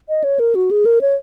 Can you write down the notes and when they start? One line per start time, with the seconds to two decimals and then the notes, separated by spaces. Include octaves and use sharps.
0.09 D#5
0.24 C#5
0.39 A#4
0.55 F#4
0.71 G#4
0.85 A#4
1.01 C#5